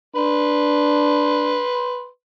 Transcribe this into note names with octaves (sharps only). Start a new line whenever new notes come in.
D4 B4 C6